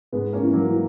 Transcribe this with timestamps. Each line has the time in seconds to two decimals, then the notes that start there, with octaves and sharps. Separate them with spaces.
0.12 G#2 G#3 B3
0.33 A#3 C#4
0.43 E3
0.53 F#3 A#3
0.72 E3